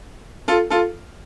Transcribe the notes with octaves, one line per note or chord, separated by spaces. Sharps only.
F4 A4
F4 A4